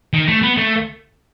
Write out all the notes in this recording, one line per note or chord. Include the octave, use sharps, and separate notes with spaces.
D#3
A3
B3
A3